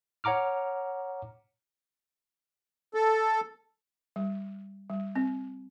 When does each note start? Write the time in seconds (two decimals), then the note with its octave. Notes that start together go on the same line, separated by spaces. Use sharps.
0.24 C#5 F#5 A#5 D6 F6
2.94 A4
4.16 G3
4.90 G3
5.15 C4